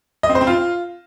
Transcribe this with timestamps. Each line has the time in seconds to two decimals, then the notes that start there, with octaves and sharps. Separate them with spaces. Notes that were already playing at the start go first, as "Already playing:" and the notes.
0.23 D#5
0.29 C4
0.35 C5
0.41 C4
0.47 F4